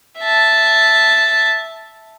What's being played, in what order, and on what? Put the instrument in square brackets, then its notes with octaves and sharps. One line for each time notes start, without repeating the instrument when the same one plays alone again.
[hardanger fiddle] E5 A5